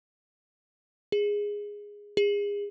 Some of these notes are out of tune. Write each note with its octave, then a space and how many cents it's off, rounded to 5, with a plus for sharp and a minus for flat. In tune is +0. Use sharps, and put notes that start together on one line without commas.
G#4 -10
G#4 -30